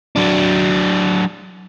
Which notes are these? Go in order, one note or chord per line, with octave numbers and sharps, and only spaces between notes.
F#3 D4